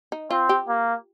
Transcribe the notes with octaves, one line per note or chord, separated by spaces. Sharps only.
D#4
C4 F4
G4
A#3